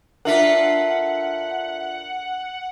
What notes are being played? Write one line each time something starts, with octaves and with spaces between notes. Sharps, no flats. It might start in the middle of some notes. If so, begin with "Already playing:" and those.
D4 F4 A4 A#4 E5 F#5 B6